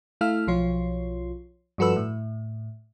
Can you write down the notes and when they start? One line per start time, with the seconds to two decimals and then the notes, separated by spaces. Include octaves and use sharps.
0.21 A3 E4 A4 F5 F6
0.47 B1 F3 F4 C#5
1.78 G2 F3 F#4 A4 B4 E6
1.96 A2